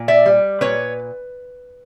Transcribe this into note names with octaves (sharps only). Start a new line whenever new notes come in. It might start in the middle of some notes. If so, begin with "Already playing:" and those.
Already playing: A#2
D5 E5
G3
A#2 B4 C#5